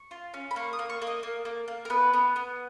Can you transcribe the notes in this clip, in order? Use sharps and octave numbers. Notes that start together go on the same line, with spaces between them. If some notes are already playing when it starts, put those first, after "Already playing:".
Already playing: C#6
F4
C#4
B5
A#3 C#6
D#6
A#3
C#6
A#3
D#5
A#3
A#3
A#3
A#4
B3 B4
B3
B3